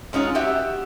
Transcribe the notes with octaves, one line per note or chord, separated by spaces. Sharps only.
G#3 C#4 D#4 F4
F#4 G4 E5